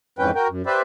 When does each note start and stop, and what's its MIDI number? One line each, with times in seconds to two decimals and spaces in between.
0.19 0.31 41
0.19 0.31 44
0.19 0.31 52
0.19 0.31 61
0.19 0.31 71
0.19 0.31 79
0.35 0.48 66
0.35 0.48 70
0.35 0.48 79
0.49 0.62 42
0.66 0.82 67
0.66 0.82 71
0.66 0.82 72
0.66 0.82 74
0.66 0.82 76